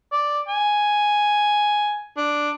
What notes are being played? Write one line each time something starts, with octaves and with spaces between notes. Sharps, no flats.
D5
G#5
D4